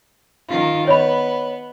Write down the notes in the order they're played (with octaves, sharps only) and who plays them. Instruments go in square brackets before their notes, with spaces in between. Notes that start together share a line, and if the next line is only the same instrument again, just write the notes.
[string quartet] D#3 F4
[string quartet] B3 [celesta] C#5 D#5 B5